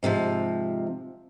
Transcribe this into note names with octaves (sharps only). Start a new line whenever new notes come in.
G#2 C3 D#3 F3